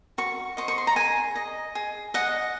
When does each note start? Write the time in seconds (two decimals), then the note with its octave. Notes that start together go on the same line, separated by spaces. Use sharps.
0.18 F#4 C#6
0.57 C5 D#5 C#6
0.68 C#6
0.78 C6
0.87 A#5
0.96 G#4 G#5
1.36 D#5
1.75 G#4
2.14 D#5 F#5